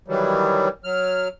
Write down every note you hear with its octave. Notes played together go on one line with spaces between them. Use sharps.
D#3 E3 F#3 G3
F#3 F6